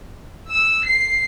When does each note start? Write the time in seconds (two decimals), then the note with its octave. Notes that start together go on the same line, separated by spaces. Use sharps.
0.51 E6
0.86 C7